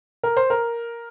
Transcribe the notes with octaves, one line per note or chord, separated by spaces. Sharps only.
A#4
C5
A#4